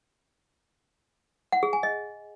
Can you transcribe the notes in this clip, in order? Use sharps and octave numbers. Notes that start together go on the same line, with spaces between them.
F#5
G#4
G#5
D#5